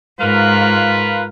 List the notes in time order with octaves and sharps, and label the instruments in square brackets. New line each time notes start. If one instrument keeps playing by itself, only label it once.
[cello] G#2 [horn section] F4 A#4 B4